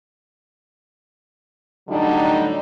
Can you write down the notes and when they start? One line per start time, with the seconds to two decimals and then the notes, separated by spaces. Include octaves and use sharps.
1.89 A2 D3 F#3 G3 D4 D#4